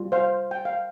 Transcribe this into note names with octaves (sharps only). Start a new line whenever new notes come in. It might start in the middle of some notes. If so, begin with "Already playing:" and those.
Already playing: G3 F4
C5 F5
G5
F5